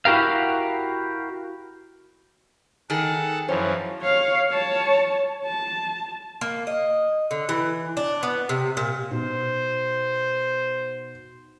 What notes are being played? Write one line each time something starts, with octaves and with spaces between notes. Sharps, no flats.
E4 F#4 G4 A#4 F5
D#3 G#4 A4 F#5 A5
F#2 E3 F3 C5 C#5
C#5 F5
C#5 A5
A5
A#3
D#5
D3
E3
D4
B3
C3
A#2
B2 D#4 C5